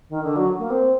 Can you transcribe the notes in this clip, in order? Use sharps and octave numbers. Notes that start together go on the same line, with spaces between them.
D#3
D3
F#3
A#3
C4